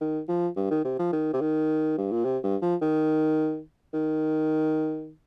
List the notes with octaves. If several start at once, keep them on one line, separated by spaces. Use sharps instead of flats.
D#3
F3
G2
D#3
C3
F3
D#3
C3
D#3
G2
A#2
C3
G2
F3
D#3
D#3